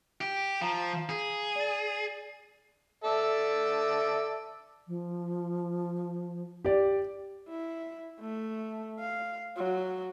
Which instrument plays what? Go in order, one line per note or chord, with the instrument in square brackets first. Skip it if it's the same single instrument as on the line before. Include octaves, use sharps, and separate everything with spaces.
[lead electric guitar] G4
[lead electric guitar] F3 [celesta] F5 A#5
[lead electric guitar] G#4
[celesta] D5 A6
[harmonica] A4 D5 E5
[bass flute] F3
[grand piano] G4 D5
[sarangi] E4
A3
F5
F#3